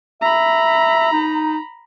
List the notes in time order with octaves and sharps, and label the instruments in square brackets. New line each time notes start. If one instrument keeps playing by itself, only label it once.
[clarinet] E5 [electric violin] A#5 B5
[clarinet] D#4